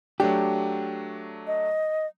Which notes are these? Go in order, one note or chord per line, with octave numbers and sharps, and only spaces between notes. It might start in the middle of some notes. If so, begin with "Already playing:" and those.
F#3 A3 D4 G4
D#5